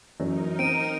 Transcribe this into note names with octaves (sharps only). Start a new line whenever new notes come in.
F#2 E3 C#4 D#4 A#4
C4 D7 D#7